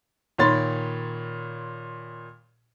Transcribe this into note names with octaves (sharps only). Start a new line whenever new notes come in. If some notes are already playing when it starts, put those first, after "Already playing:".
A#2 D#3 C#5 B5 C6 A6